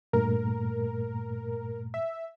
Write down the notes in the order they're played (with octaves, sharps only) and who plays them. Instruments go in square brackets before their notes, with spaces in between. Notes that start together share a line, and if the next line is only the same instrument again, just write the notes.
[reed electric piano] G2 A#2 A3 [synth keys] A#4
[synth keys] E5